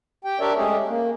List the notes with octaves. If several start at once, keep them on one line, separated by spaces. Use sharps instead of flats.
G4 G5
D4 G4 A#4 C#5 D5 E5
G#3 A3 C#4 G4 G#4
A#3